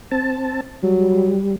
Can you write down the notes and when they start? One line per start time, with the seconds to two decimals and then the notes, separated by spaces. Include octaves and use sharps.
0.11 C4 A5
0.83 F#3 G3